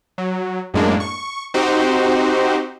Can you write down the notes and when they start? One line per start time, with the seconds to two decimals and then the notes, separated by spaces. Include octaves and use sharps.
0.18 F#3
0.74 F#2 A2 G#3 A#3 D4
1.00 C#6
1.54 C4 D#4 F#4 G4 C5